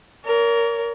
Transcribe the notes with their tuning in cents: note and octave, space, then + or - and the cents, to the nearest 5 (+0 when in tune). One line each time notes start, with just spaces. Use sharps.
A#4 +0 C#5 +45